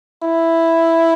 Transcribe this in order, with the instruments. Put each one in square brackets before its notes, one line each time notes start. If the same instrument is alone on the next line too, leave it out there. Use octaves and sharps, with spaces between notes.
[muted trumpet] E4